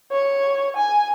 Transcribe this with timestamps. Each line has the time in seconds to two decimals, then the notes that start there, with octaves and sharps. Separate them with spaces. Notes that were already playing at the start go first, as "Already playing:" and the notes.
0.12 C#5
0.76 G#5